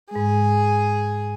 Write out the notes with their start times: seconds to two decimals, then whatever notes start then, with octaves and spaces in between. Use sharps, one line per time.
0.11 G#2 G#3 G#4